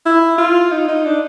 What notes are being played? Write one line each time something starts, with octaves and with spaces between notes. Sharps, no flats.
E4
F4
D#4
D#4
D4